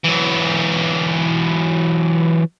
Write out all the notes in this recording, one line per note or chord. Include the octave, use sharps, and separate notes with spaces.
E3 F#3